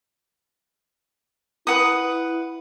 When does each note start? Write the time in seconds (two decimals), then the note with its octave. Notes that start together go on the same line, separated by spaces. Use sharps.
1.67 E4 B4 F#5 D#6